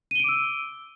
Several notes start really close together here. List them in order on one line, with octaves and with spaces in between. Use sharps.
D#7 G7 D7 D6 E6